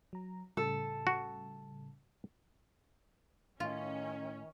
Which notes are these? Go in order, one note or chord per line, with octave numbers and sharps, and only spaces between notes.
F#3 A#5
A2 C#3 G3 A4
F#4
A2 D#3 C#4 F4